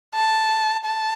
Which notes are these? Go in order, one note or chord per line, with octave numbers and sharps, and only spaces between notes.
A5
A5